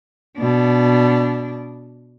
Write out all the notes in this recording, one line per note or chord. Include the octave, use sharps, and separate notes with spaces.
B2 D4